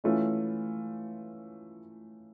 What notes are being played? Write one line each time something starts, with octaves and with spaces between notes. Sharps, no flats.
E3 A3 C#4 F4